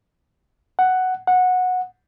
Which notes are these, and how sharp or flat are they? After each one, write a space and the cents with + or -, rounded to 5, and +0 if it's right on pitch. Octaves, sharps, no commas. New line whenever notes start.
F#5 +5
F#5 -15